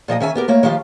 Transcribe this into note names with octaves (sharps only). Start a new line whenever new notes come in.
A#2 F3 D#5 G5
D#3 C#4 E5 G#5
B3 G4 A#4
A3 A#3 C#5
D#3 F3 F4 G4